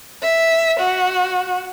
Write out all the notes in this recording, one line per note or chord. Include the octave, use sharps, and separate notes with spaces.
E5
F#4